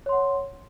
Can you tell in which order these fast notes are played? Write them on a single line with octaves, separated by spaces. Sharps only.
C#5 C6 F#5